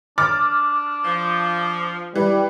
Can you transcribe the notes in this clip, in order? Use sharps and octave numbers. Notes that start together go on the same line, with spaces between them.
D4 D6 F6 A6
F3
E3 G3